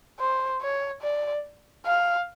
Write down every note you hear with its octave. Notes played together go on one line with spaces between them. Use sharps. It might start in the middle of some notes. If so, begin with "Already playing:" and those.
C5
C#5
D5
F5